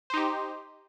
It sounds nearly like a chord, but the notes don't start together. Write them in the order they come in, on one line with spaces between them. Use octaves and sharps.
C5 D#4 G4